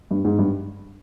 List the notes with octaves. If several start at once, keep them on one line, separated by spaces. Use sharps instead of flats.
G2
G#2
G2